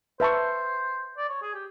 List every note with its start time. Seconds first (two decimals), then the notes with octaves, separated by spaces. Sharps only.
0.20 B4 C5 E5 A5 C#6
1.17 D5
1.29 C#5
1.42 G#4
1.54 G4